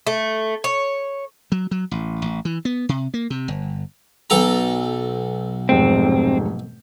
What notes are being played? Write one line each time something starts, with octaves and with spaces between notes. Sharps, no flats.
A3
C#5
F#3
F#3
A1
A1
E3
B3
C3
A#3
C3
G1
B1 A4 A#5
F1 G#2 C4 G5